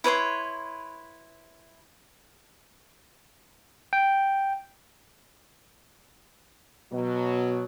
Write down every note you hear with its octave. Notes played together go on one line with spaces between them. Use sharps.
E4 B4 C#5 C6
G5
B2 F#3